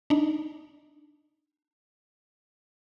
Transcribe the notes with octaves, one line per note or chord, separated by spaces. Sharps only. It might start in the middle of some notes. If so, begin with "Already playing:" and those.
D4 D#4